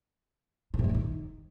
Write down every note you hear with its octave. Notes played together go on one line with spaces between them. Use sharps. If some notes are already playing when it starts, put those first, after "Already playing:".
C#3
C3
G#2
F#2
D#3